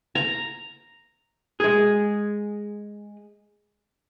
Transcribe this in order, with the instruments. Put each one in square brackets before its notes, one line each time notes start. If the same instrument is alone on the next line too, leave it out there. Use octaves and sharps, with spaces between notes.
[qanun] A#5
[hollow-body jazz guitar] G#3 G#4